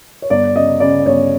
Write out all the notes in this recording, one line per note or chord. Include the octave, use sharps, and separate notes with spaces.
C#5
G1 D5
C#3 D#5
C#3 D5
G1 C#5